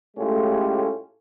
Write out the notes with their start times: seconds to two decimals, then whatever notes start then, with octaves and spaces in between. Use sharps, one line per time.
0.17 A2 G#3 A3 C#4 F4 G4